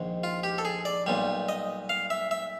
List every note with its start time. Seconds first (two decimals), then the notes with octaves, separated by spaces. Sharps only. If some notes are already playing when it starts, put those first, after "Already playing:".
Already playing: A#1 G#2 D#3 G#3
0.24 F4
0.44 G4
0.58 A4
0.65 G#4
0.85 D5
1.07 B1 A#2 G3
1.49 D#5
1.89 F5
2.10 E5
2.31 E5